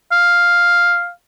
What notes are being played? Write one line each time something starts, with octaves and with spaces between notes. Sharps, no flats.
F5